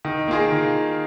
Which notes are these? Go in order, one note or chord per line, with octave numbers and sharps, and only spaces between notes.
D#3
A#3 F4 G#4
D#3